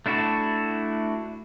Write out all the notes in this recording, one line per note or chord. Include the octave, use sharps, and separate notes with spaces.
A3 D4 E4 F#4